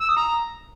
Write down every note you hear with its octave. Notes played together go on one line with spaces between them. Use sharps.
E6
D#6
A#5